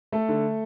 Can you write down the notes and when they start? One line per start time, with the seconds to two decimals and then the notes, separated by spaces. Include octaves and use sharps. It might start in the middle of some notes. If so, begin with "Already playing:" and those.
0.12 A3 A4
0.29 D3